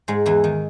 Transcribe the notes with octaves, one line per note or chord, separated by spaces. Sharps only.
G#2 G#3
E2 E3
D#3